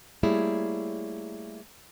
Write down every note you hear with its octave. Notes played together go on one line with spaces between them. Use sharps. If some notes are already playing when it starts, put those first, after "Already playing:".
G3 A3 A#3 E4 G#4 C#5